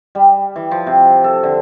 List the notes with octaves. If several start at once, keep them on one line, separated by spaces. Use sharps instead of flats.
G3
E3
F3
C3
A4
D3